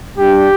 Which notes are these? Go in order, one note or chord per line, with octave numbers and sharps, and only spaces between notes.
G2 G3 D4 G4